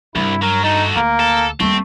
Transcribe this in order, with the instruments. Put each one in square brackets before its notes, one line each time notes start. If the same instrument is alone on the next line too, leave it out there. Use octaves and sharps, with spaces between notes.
[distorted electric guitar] C2 [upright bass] G2 [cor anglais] E4
[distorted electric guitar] F#3 [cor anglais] A#4
[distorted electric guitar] A3 F#4 [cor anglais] D#4
[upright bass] D2 [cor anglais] A#3
[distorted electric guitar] A4
[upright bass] D#2 G3 [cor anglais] A3 [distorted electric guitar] C4